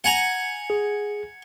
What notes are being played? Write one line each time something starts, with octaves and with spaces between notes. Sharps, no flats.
F#5 G#5 A#5
G#4